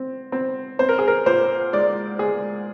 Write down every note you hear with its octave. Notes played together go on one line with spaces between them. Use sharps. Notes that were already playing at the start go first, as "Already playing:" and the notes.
Already playing: C4
C4
C4 C5
A#4
G#4
A#4
A#2 C5
G#3 D5
G#3 G#4